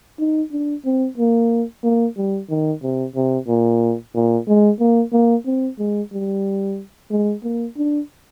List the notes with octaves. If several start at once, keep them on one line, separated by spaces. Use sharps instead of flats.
D#4
D4
C4
A#3
A#3
G3
D#3
C3
C3
A#2
A#2
G#3
A#3
A#3
C4
G#3
G3
G#3
A#3
D4